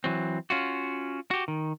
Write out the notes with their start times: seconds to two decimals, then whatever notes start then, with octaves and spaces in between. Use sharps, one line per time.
0.04 E3 F#3 C4
0.50 C#4 F4 F#4
1.31 F#4 G4
1.48 D#3